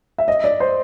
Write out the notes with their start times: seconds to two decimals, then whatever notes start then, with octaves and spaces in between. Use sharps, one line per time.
0.18 E5
0.28 D#5
0.44 D5
0.60 C5